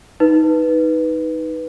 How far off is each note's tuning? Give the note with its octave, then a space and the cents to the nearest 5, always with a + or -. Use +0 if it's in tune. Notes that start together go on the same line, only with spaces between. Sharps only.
D#4 +15 B4 +0